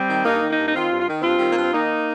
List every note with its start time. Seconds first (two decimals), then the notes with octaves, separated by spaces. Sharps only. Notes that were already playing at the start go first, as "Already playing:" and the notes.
Already playing: G3 C4
0.08 D#3
0.24 G2 A#3 D#4
0.41 D#3
0.50 A#3 D#4
0.58 G2
0.65 D#4
0.74 D#3 C4 F4
0.91 G2
1.00 F4
1.08 D#3
1.22 G2 C4 F4
1.38 D#3 G3
1.50 A#3
1.57 G2 C4
1.73 D#3 A#3 D#4